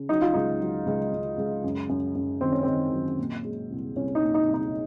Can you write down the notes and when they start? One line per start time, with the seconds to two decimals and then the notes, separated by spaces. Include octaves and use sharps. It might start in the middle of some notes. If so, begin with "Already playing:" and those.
Already playing: C#3
0.09 F#3 D#4
0.21 F4
0.34 C#2 D#4
0.60 F#3
0.86 C#2
1.12 C#2
1.38 C#2
1.64 F#2
1.89 F#2
2.15 F#2
2.41 D#3 C4
2.52 C#4
2.63 D#3 C4
2.93 F#3
3.18 A#2
3.45 G#3
3.70 C2
3.96 C2 C#4
4.15 D#4
4.21 A#2
4.34 D#4
4.47 C2
4.54 D#4